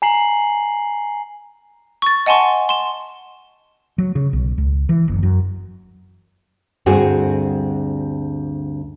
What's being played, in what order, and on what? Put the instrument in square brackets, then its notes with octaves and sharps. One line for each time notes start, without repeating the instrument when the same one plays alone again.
[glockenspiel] G#5 A#5 C7 F#7
[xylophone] C#6 A6
D#5 F#5 G#5 A5 C6 C#6
C6 E7
[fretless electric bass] F#3
C#3
B1
C#2
E3
F#1
F#2
[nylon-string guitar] D2 G2 C4 F#4 G#4 F#5